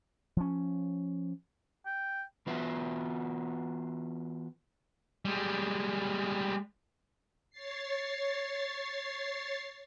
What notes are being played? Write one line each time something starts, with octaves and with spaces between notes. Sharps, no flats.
F3 C#4
G5
E3 B3 F4 F#4 B4 E5
G3 G#3
C#5 A6 C7